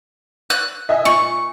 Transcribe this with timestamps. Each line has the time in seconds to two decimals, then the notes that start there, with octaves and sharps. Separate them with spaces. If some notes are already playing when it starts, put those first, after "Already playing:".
0.50 F#6
0.89 D#5 E5 G#5
1.05 A#2 C#6